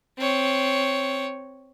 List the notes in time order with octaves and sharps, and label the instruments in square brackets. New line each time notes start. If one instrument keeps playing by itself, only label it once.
[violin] C4 C#5